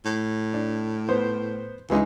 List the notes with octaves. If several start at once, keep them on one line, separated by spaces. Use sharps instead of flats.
A2
D4
B3 C5
C#2 E3 G#3 D#4